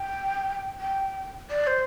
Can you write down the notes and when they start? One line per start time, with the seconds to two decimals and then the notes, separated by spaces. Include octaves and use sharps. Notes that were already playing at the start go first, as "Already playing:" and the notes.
Already playing: G5
0.80 G5
1.50 D5
1.67 C5